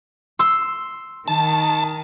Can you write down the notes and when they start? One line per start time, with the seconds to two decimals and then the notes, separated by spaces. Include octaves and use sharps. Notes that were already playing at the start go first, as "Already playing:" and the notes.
0.39 C6 E6
1.28 D#3 A5